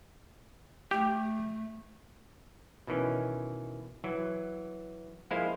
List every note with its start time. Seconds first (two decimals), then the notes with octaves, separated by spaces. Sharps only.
0.91 A3 G4
2.87 B2 D#3 E3 C#4
4.04 E3 F#3
5.31 F3 G#3 A#3 E4 C5 F5